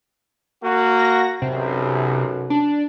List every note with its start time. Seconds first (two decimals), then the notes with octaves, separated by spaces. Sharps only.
0.64 A#3 F#4
0.99 A#6
1.42 B1 F#2 C3
2.50 D4